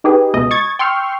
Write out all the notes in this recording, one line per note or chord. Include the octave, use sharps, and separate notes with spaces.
D#4 G4 G#4 B4
C#2 B2 D#5 D#6
C#6 D#6 G#6 A6
G5 C6 C#6 E6 F6